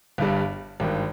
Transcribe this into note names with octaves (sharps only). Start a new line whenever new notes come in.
G1 G2 G3
G#1 G2 D#3